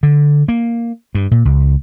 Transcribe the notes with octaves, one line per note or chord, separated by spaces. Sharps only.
D3
A#3
G2
A#2
C#2